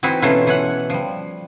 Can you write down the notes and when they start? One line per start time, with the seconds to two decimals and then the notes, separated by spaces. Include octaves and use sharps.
0.03 E3 C4 D#4 E4 F#4 A#5
0.22 B2 E3 C#4 F4 A4 A#5
0.47 E3 C#5 F#5
0.90 F3 G3